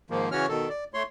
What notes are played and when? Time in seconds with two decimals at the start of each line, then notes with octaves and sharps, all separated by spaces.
0.10 G#2 D#3 F3 A#3
0.32 C#3 E3 C#4 F#4 C#5 F6
0.48 B2 D#3 A4
0.69 D5
0.94 A3 C#5 C6